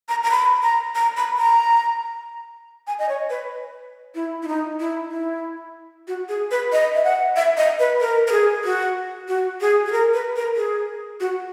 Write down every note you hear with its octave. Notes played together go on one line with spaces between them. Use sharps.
A#5
A#5
B5
A#5
A#5
B5
A#5
G#5
D#5
C#5
B4
E4
E4
D#4
E4
E4
F#4
G#4
B4
D#5
E5
F#5
E5
D#5
B4
A#4
A#4
G#4
F#4
F#4
G#4
G#4
A#4
B4
A#4
G#4
F#4